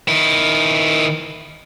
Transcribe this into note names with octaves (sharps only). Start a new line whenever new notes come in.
D#3 E4